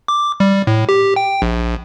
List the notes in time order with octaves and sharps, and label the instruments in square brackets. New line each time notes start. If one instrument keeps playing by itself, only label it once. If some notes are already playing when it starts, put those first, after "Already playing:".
[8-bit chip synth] D6
G3
A2
G4
G5
A#1